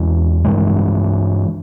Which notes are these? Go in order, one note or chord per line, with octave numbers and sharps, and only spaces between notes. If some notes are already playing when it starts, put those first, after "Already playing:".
Already playing: E2 E3 G#3 C#4
G2 E3 G#3